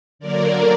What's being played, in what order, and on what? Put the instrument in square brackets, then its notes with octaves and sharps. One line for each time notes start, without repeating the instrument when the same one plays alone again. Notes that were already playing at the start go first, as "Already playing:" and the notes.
[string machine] D3 F#3 A#3 A#4 D5